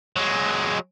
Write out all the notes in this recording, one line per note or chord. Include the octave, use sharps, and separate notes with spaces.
F#3 G#3